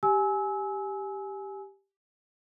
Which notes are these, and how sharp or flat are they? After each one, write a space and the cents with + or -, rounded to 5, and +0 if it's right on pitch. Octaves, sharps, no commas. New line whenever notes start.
G4 +0 G#5 +15 E6 -25